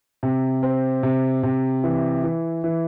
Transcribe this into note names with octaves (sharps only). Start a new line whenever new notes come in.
C3
C4
C3
C3
E3
E3
E3